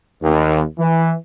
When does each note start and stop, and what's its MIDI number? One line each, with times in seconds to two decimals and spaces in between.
0.22 0.62 39
0.78 1.13 52